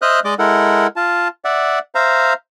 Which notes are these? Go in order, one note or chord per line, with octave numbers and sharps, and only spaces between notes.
C5 D#5 E5 D#6 F6 F#6
G#3 D5 D#5 D6
G#3 E4 A4 A#4 F#5
F4 A5
D5 E5 F#5
C5 E5 F5 A#5